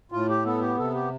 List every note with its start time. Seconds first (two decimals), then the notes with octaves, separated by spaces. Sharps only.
0.12 A2 F4
0.29 G4
0.45 B3 A4
0.61 G4
0.77 C3 A4
0.94 G4